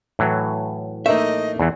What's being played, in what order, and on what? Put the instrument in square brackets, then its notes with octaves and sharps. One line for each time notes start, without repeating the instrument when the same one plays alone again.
[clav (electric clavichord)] A2 E3 F#3
[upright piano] A3 A#3 D#4 [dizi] D#5 [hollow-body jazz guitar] E5
[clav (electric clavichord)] E2 E3